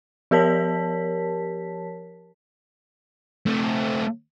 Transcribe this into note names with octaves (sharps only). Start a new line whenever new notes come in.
F3 G4 A#4 C#5 A5 B6
A3 C4